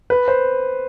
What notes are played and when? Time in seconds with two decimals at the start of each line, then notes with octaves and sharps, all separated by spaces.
0.10 B4
0.28 C5